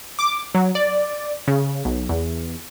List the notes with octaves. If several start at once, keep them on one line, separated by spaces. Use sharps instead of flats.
D6
F#3
D5
C#3
B1
E2